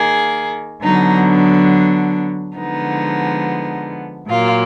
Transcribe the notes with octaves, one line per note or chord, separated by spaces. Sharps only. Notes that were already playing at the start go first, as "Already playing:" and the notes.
Already playing: D#3 A#3 G#4
D3 F#3 B3 D#4
D4
D3 F3 G#3 B3 D#4
A#2 F#3 A#3 F4